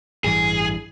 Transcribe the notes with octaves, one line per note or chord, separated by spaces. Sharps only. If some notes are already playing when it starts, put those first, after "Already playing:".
A1 G2 E3 G#4